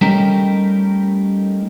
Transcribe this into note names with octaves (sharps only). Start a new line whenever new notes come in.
G3 A3 C#4 D#4 G4 A#4